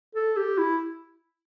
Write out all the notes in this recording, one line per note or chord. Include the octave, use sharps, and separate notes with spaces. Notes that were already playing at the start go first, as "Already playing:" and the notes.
A4
G4
E4